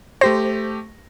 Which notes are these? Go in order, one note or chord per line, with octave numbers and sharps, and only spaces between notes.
A3 G4 C5 A#6